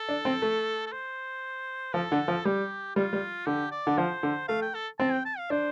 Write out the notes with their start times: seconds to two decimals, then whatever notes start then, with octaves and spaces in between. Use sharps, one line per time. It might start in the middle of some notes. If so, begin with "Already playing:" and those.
Already playing: A4
0.09 D4
0.25 C4
0.42 A3
0.86 A4
0.92 C5
1.94 F3 A4
2.12 D3
2.28 F3
2.45 G3 G4
2.96 G3 F4
3.13 G3
3.47 D3 G4
3.72 D5
3.87 D3
3.98 F3 C5
4.23 D3
4.48 A3 F5
4.62 G5
4.74 A4
4.99 C4 A5
5.12 G5
5.25 A5
5.38 F5
5.50 D4 C5